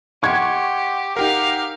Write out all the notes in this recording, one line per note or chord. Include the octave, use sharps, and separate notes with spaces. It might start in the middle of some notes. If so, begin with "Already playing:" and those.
G4 D#5 F#5 C6 C#6 G#6
D#4 G4 A#4 F5 F#5